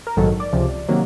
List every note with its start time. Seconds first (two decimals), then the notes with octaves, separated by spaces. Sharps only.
0.07 A#4
0.16 A#1 G#2 D#3 F#3 A4
0.40 D5
0.53 C#2 C3 F3
0.89 C3 D#3 F#3 A#3